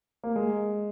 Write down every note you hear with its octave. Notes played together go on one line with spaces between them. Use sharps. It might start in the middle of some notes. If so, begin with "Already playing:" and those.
A#3
G#3